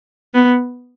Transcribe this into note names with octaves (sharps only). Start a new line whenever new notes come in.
B3